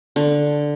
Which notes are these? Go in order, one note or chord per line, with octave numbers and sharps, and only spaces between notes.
D3